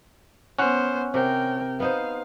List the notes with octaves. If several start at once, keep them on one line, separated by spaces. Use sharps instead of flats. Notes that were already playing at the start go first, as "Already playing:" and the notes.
B3 C#4 C5 F#5
C3 A#4 G5
B3 D#4 C5 F5